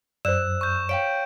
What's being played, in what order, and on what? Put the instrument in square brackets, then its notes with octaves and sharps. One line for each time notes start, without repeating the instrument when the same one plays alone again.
[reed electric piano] F#2 [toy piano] C5 D5 [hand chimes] E6 F#6 [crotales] E7
[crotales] C#6 G6
[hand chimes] C#5 F5 G5 [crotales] D7